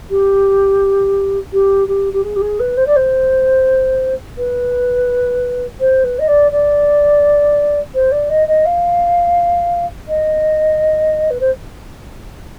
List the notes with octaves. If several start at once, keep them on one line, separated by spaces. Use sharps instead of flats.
G4
G4
G4
G4
G#4
G4
G#4
B4
C5
D5
C5
B4
C5
B4
D#5
D5
D5
C5
D5
D#5
D#5
F5
D#5
B4
C5